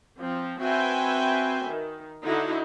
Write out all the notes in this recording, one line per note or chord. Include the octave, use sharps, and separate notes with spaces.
F3 C4
C4 F#4 B4 E5 G5 G#5
D#3
D3 D#4 E4 F#4